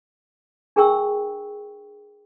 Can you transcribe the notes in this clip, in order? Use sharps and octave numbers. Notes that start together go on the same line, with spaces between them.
D4 G#4 A#4 G5 C#6 E6